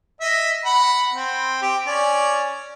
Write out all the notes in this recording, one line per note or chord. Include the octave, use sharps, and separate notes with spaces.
D#5 E5
F#5 B5
C4
G4
C#4 D5